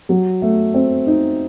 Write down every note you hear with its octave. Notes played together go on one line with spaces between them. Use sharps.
F#3
A3
C4
D#4